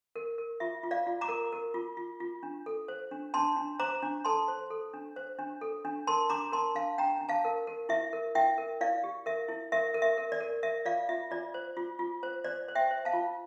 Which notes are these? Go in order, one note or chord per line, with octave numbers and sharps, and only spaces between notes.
A#4
A#4
F4 E5
F4
D5 F5
F4
A#5 D6
A#4
A#4
F4
F4
F4
D4
A4
C5
D4
D4 A5 C6
D4
C5 A#5 D6
D4
A4 A5 C6
C5
A4
D4
C5
D4
A4
D4
A#4 A5 C6
D4 A#5 D6
A#4 A5 C6
D4 F5 A5
D4 G5 A#5
D4
F5 A5
A#4
A#4
E4 E5
A#4
E4 E5 G5
A#4
E4 D5 F5
G4
A#4 E5
E4
A#4 E5
A#4
E5
A#4
D5
A#4
A#4 E5
F4 D5 F5
F4 E5
F4 D5
C5
F4
F4
C5
C5 D5
C5
E5 G5
C5
F5 A5
F4